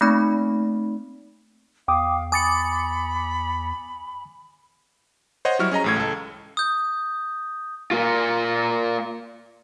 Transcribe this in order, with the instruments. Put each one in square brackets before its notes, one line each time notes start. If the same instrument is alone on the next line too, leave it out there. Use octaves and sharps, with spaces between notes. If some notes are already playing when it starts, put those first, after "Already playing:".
[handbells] A3 A#3 C4 D#4 B5
[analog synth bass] E2 [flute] F5 [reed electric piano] G5 D6 D#6
[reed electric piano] G#5 D#6 [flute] B5 [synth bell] D6 A6 C#7
[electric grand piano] C5 C#5 D#5 F#5
F#3 G3 E4 C#6 F6
C#4 G#4 D#5 A#5
A1 A2 G#6
C#2 A4
[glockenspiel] D#6 G6
[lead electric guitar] A#3 F4